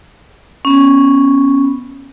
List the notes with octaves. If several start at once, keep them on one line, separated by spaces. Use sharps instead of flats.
B3 C#4